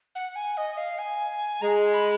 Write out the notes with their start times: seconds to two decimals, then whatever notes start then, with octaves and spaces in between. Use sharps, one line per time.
0.15 F#5
0.36 G#5
0.57 D#5
0.77 F5
0.98 G#5
1.62 G#3 A#5
1.93 B5